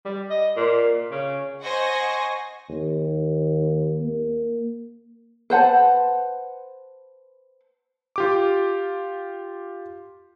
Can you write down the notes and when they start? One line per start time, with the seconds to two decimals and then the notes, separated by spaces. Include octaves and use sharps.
0.05 G3
0.30 D#5
0.56 A#2
1.11 C#3
1.63 C5 D#5 F#5 G#5 C#6 A#6
2.70 D#2
4.01 A#3
5.50 B4 C5 F#5 A5
8.16 F4 G4 D6